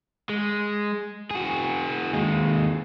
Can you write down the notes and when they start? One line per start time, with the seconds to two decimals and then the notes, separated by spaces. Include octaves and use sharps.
0.29 G#3
1.31 F#4 G#4
2.13 D#2 G#3